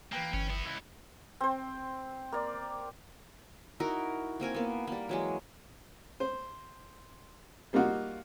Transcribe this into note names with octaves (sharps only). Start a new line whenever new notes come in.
E3 A#3 B4 G5
G1 C#4
B3 E4
C#2 E4
C4 C5
A#3 D5
D#4 E4 F#4 A#4
A#3 C4 A#4 G#5
A#3 B3
G3 A#3
E3 F#3 G#3
C5
G3 A#3 D#4 F4 F#4